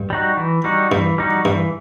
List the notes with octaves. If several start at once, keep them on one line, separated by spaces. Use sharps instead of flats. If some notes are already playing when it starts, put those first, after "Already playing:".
Already playing: G2
G3 D#4 F#4
E3
G3 D#4 F#4
G2 E3
G3 D#4 F#4
G2 E3